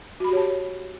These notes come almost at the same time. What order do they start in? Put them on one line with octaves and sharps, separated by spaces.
F#4 B5 G4 C#5 A5